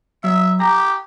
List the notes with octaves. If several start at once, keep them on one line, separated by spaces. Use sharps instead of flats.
F#3 E5
G4 A#5